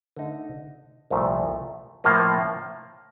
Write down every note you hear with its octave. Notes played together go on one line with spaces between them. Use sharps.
D3 A3 D#4
C2 A#2 F3 A3
A2 F3 A#3 F4